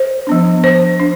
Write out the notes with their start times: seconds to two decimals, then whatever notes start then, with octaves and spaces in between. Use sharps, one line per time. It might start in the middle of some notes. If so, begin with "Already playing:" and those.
Already playing: C5
0.27 F3 B3 D4
0.64 C5
1.00 D4